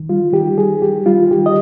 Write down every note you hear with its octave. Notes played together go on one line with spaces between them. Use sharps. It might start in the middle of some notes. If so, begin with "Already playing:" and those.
Already playing: D#3
G3 F4
D#3 G4
G3 G#4
D#3 G4
G3 F4
D#3 G4
D#5